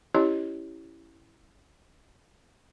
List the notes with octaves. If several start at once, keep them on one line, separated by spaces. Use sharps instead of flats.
C#4 E4 G4 C#5 D#5